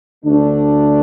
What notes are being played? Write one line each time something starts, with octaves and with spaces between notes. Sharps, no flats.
D2 D3 A3 D4